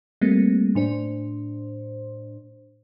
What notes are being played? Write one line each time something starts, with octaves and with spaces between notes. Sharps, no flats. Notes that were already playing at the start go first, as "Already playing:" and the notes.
G3 A3 A#3 C4
A2 D4 C5